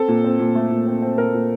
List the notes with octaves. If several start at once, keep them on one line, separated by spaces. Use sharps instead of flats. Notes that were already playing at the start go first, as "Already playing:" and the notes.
Already playing: C4 A4
A#2
C4
A#2
A3
A#2
C4
C4
A#2 A#4
A#2